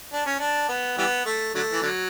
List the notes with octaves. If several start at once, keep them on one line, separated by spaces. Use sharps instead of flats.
D4
C#4
D4
B3
E3 G3 B3
A3
D3 F#3 A3
E3
D3 F#3